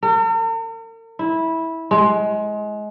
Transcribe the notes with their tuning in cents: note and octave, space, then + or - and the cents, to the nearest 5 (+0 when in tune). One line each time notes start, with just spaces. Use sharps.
A#4 -45
E4 -15
G#3 +25